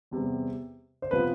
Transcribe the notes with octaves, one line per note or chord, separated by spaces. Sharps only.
E2 C3 G3 B3
C5
C3 F3 B3 B4